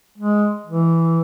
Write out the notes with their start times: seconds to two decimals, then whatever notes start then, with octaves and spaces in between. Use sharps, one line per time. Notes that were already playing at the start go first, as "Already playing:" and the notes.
0.18 G#3
0.66 E3